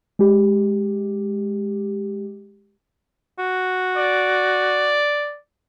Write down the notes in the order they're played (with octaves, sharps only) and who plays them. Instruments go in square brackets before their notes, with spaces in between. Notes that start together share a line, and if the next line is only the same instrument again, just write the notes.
[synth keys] G#3 G4
[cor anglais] F#4
[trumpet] D5